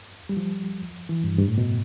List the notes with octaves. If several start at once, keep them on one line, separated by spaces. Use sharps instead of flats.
G3
F3
E3
G2
G2
A2
B2